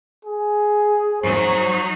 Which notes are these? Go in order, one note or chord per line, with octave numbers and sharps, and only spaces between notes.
G#4
F#3 D#4 C5